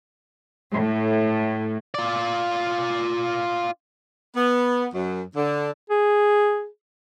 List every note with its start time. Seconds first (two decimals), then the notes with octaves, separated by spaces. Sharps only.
0.74 A2
1.94 F4 D5
4.35 B3
4.94 F#2
5.36 D3
5.90 G#4